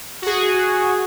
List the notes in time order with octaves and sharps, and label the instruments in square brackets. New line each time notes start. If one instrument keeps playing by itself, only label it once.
[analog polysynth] F#4 G#4